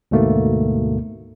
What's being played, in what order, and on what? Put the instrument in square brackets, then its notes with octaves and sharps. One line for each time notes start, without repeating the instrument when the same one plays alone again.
[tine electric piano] D2 G#2 B2 A3 A#3